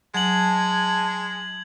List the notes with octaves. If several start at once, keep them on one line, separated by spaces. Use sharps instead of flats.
F#3 G#3 A5 G#6 F#7